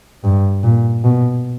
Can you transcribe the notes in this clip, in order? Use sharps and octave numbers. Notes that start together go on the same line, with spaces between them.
G2
A#2
B2